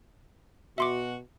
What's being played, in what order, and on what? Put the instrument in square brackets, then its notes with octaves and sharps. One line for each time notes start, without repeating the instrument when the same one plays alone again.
[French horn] B2 [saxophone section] F#4 [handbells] E5 C6 D6